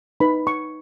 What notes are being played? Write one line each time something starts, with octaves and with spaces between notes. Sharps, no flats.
D#4 B4 B5
C#6